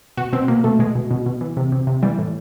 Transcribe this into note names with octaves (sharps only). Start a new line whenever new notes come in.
B2 F#4
B2 C4
B2 A#3
B2 A3
B2 G#3
B2
B2
B2
E3
C3
C3
C3
E3 G3
A2